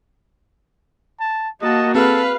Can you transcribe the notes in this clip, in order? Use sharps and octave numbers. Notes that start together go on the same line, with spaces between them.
A5
A#3 F#4 D#5 A5
C4 G#4 A4 B4 F5